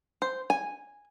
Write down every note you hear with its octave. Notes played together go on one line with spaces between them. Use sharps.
C5
G#5